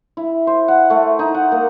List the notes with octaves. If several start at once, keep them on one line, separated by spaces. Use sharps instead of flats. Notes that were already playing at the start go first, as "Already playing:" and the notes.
E4
C5
F#5
A3
D#4
F#5
A#3